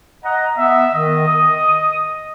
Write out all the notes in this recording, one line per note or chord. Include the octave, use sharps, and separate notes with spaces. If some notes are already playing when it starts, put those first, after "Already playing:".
D#5 F#5 A#5
B3 E5
D#3 D#5
D#6